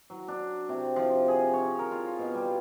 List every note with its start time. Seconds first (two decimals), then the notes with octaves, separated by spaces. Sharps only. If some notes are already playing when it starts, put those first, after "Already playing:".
0.10 F#3
0.28 D4
0.69 C3
0.96 F3
1.28 G#4
1.54 C#5
1.79 A#4
1.92 F4
2.19 B2
2.34 G3